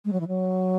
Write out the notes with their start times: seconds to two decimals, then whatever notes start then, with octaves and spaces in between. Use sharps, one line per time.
0.05 G#3
0.12 F#3
0.20 E3
0.28 F#3